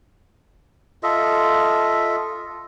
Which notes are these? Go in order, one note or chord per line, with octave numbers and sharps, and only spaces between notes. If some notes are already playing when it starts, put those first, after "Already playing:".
F4 A4 D#5 E5